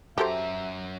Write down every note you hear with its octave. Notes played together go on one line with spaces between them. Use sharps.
F#2 F#4 G4 A4 C5 E5 A#5